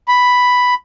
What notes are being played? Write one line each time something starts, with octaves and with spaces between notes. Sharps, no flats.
B5